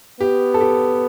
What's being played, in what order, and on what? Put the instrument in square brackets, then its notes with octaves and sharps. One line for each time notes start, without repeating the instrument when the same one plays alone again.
[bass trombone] B3 [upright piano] G4
[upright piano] A4
G4